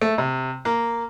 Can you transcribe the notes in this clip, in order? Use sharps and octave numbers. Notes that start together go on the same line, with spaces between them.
A3
C3
A#3